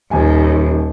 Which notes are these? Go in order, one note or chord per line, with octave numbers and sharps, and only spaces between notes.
D#1 D#2 G#5